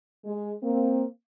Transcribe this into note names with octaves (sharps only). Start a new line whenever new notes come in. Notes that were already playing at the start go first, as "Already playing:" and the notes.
G#3
A#3 C4